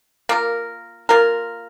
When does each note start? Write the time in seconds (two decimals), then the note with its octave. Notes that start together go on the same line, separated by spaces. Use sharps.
0.29 A#3 F4 A#4
1.09 A#3 F4 A#4